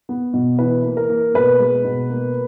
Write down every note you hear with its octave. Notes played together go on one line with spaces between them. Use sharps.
B3
B2
E3 B4
A#3
A#4
A#3
B2 B4
G#3
B2
A#3